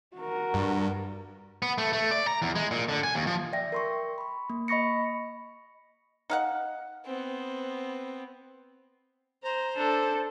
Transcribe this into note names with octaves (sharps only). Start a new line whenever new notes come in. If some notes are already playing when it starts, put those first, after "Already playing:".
F#4 A#4
G2
B3
A3
A3
D5
A#5
E2
G#3
A#2
D3
G#5
D#2
F3
D5 E5 G5 A#6
A#4 C6 C#6
B5 C#6
A#3
D#5 B5 C#6 A#6 C#7
D#4 F5 F#5
B3 C4
C5 A#5
D4 A4